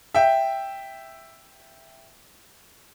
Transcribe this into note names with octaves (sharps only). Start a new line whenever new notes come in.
E5 G5